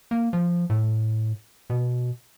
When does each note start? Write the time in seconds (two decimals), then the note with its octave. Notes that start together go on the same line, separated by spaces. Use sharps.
0.11 A#3
0.33 F3
0.70 A2
1.70 B2